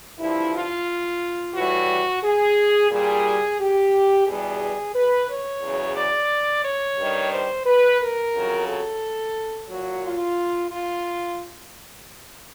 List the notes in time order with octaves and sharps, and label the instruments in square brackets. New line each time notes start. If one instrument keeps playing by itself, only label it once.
[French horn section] G2 D3 F3 E4
F4
A2 E3 G3 F#4
G#4
A#2 G3 G#4
G4
E2 B2 G3 G#4
B4
C#5
E2 C#3 F#3
D5
C#5
G2 D#3 G3
C5
B4
A#4
F2 C#3 F#3
A4
A#2 F#3 F#4
F4
F4